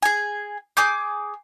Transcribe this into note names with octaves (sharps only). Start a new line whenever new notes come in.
G#4 G#5
G#4 G#5 D6 G6